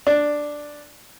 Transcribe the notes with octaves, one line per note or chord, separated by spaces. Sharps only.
D4